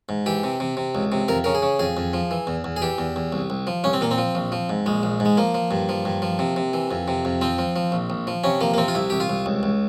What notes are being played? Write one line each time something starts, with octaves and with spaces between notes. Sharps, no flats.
G#2
E3 G4
C3
C3
C3
C#2
C3
F2 A#4
C#3 A#4
G#4
C#3
F2 G#4
F2
F3
E3
E2
E2
G#4
E3 G4
E2
E2
C2
C2
F3
C2 C#4
C4
A#2 A#3
C4
F3
A#1
F3
G#2
A#1 G#3
A#1
G#2
G#3
F3 A#3
F3
G2
F3
G2
F3
C3
C3
E3
F2
C3
F2
F3 C4
F3
F3
A#1
A#1
F3
C3 C#4
F3 A#3
A#3
C3 C4
F4
C2 E4
C2 G4
F4
C2
C#2
C#2